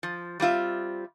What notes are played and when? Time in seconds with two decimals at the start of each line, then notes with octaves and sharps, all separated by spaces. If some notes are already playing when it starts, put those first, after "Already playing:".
0.03 F3
0.40 G3 C4 F4 E5